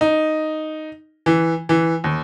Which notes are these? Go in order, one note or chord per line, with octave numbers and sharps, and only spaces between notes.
D#4
E3
E3
D#2